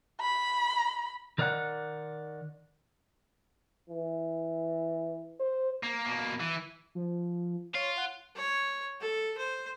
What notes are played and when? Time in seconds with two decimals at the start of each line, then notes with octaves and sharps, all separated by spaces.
0.21 B5
1.38 D#3 A#4 D5 D#5 F#5
3.90 E3
5.40 C5
5.83 A#3
6.06 B2 A#3
6.40 E3
6.95 F3
7.75 F4 C#5
7.97 F#5
8.36 C#5
9.01 A4
9.38 C5